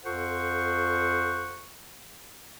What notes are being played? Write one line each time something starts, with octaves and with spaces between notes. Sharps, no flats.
F2 F4 A4 C5 F#5 C#6